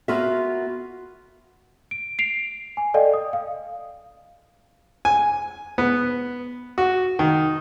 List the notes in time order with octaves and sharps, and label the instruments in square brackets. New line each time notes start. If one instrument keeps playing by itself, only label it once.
[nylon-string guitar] B3 F4 F#4 A#4 E5
[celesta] D7
C7 D7 F7
G#5
A4 D5 D#5 F5 G5
D#6
F5
[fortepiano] G#5
B3
F#4
D#3